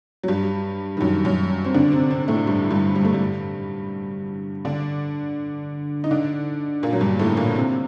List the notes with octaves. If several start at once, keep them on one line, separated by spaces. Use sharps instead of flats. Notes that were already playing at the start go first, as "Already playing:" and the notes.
F#3
G2 G3
D#3
F#2 F#3
F#2 F#3
C4
D3 D4
C3 C4
C3 C4
A2 A3
G2 G3
G2 G3
G3
A3
G2 G3
D3 D4
D#4
D3 D4
A#2 A#3
F#3
G2 G3
A2 A3
A#2 A#3
C3 C4